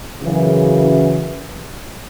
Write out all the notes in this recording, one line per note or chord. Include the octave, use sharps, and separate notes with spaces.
F#2 C#3 E3